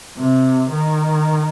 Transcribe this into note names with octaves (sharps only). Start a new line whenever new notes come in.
C3
D#3